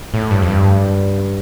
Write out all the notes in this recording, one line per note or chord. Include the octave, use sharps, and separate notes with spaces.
A2
G2
F2
G2